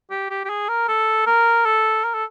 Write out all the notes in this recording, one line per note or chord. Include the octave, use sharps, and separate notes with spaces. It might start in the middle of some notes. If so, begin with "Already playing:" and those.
G4
G4
G4
G#4
A#4
A4
A#4
A4
A#4
A4